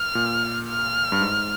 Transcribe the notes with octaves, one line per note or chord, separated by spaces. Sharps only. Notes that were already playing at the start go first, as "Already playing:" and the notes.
Already playing: F6
A#2
F6
G2
G#2